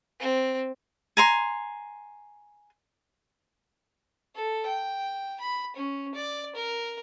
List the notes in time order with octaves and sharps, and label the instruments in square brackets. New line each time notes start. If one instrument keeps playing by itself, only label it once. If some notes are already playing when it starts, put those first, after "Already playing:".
[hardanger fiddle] C4
[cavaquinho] G#5 A#5 C6
[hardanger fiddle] A4
G5
B5
C#4
D5
A#4